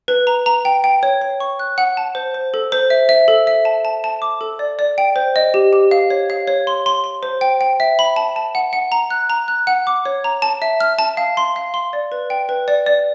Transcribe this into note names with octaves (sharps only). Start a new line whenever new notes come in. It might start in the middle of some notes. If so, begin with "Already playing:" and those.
B4
A#5
A#5
G5
G5
C#5
C#5
C#6
F#6
F#5
A5
C5
C5
A4
C5
E5
E5
A4
E5
A5
A5
A5
D6
A4
D5
D5
G5
C5
D#5
G4
G4
F5
C#5
F5
C#5
C6
C6
C6
C5
G5
G5
E5
B5
A5
A5
F#5
F#5
A#5
F#6
A#5
F#6
F#5
D6
C#5
A#5
A5
E5
F6
A5
F5
C6
F5
C6
D5
B4
G5
B4
D5
D5